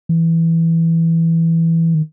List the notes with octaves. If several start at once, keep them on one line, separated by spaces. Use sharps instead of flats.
E3
D#3